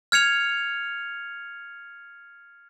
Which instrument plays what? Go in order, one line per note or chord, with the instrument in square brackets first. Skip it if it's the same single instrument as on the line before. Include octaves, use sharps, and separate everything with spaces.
[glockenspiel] F6 G#6 C#7 F7